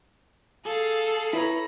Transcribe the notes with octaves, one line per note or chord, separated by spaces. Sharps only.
G#4 A4 F5
E4 B4 C#5 A#5 B5